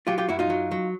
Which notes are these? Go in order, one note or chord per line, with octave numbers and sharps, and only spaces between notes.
F#3 F4 G4
F4 G4
F#2 E4 F#4
D#4 F4
F#3
F#3